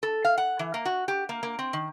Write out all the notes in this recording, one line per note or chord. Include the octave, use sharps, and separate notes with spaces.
A4
F5
F#5
E3
A#3
F#4
G4
A#3
A#3
C4
D#3